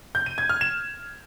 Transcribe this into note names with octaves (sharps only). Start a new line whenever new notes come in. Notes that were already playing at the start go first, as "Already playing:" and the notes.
G6
D#7
G#6
F6
E7